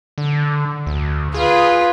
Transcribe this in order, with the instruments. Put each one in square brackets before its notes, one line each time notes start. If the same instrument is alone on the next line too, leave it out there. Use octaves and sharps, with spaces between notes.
[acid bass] D3
D2
[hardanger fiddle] F4 B4 [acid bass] G#4